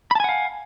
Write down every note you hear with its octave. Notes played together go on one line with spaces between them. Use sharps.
F5 F#5 G#5 A5 B5